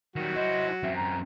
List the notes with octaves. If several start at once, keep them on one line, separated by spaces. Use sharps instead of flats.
D#3 F#3 G3 F#4
E4 C5 D#5
F#2 C4 E5
A#5